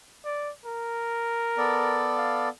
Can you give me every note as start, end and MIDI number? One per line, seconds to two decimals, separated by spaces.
0.24 0.51 74
0.66 2.11 70
1.58 2.49 59
1.58 2.49 69
1.58 2.49 74
2.17 2.48 77